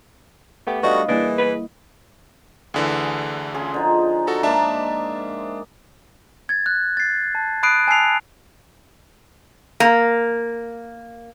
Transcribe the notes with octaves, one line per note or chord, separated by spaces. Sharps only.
A3 B3 G4 D6
G3 A3 D4 F#4 B4 D#5 F5
E3 G3 A#3 D4 E4 G#4 D#5
B4
D2 D3 E3 G#4
C#3 G#4 C6
D3 F3 D#4
F#4 A4 A#5
G#2 A#3 D4 E5 A5
G#6 A6
F#6
A6 C7
A5
B5 D#6 F#6 C7 D7 D#7
G#5 A5 E6 C7 F7
A#3